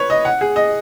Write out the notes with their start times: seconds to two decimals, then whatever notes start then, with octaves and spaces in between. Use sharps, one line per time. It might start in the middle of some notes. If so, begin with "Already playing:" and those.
Already playing: B4 C#5
0.10 D#5
0.25 F#5
0.41 G#4
0.56 D#5